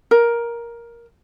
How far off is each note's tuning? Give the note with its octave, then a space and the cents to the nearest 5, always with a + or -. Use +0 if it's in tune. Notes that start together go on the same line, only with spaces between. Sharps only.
A#4 +10